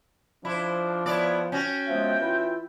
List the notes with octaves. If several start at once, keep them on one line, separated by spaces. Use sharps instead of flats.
F3 D4 E4 C5
B3 E4 C#5 D5
C#4 F#4 G5
F3 G#3 B3 E5
E3 E4 F4